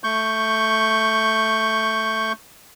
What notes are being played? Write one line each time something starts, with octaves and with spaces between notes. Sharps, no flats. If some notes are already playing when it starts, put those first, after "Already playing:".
A3 C#6 G6